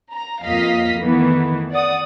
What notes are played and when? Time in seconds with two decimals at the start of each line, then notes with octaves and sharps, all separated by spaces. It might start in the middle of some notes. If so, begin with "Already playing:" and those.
0.14 A#5
0.45 F2 A#3 F4 D#5 F5 B6
1.00 D#3 E3 A3 B3
1.72 D5 F#5 D#6